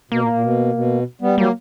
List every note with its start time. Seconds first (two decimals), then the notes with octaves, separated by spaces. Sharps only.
0.11 B2 A#3
0.23 A#2
0.33 A#2
0.43 B2
0.75 B2
1.21 G3 B3
1.37 F#3 G3 A#3